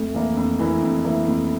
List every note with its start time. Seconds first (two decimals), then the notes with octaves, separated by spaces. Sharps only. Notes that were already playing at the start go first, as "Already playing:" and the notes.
Already playing: F2 A3
0.14 E3 A#3 E4
0.37 F2
0.59 E3 A#3 E4
0.82 F2
1.04 E3 A#3 E4
1.27 F2 A3